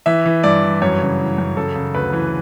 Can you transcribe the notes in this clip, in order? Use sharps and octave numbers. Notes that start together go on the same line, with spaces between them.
E3 E5
E3
G2 D5
E3
F#2 C#5
C#3
E3
F#2
C#3 A4
C#3
D2 B4
E3